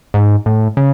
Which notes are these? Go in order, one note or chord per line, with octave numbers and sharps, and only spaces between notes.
G#2
A2
C#3